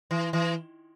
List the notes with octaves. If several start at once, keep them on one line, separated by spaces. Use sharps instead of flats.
E3
E3